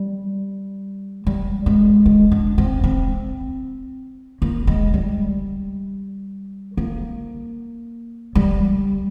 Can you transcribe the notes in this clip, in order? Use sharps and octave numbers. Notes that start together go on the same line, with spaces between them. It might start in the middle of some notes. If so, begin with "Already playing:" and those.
Already playing: G3
G3
G#3
G#3
D4
C4
C4
A#3
G#3
G3
A#3
G3